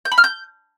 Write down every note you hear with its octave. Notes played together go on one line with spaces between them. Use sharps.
G6
B5
F6
G6